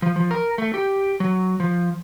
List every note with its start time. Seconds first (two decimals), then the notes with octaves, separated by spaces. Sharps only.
0.02 F3
0.16 F3
0.31 A#4
0.58 A3
0.74 G4
1.20 F#3
1.60 F3